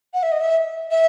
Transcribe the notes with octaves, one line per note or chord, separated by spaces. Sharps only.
F#5
E5
D#5
E5
E5